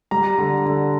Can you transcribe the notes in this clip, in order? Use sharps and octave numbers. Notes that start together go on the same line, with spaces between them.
G3 A#5
D3
D3